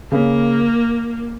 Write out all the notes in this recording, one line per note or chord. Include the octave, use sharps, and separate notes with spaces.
C#3 A#3